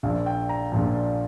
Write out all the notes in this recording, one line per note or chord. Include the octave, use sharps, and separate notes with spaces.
A#1 A#2 F3 F5
G5
A#5
A#1 A#2 F3